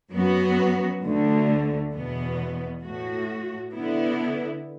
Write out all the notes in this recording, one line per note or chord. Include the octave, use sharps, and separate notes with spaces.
F#2 F#3 B3 F#4
D2 D3 A3
E2 B2 B3
A2 A3 F#4
D3 B3 E4